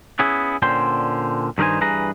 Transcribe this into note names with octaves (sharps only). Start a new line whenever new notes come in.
B3 C#4 E4 G#4
A#2 D3 C#4 C5 G5 C6
G2 D#3 D#4 A#4 C5 G#5
G2 E3 G#4 B4 A#5